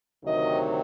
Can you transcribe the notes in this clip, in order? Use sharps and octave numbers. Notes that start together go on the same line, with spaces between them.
D2 C3 D#3 F#3 D#5